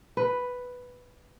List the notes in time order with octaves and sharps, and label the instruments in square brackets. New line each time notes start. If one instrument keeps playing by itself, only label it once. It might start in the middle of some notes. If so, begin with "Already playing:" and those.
[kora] B4